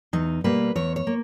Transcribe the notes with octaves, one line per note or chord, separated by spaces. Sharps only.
E2 D#4
B2 G3 A#3 B4
E2 C#5
C#5
A#3